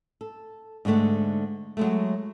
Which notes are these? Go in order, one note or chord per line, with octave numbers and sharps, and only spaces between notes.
A4
G#2 D3 G#3 A3 F#5
F#3 G#3 A3